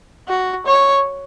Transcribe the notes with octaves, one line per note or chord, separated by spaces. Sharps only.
F#4
C#5